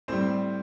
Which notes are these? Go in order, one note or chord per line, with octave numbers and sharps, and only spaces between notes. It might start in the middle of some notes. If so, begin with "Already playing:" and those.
A2 G3 C4 C5